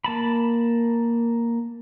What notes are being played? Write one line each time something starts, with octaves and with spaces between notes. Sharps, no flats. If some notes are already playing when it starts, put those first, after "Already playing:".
A#3 A5 B5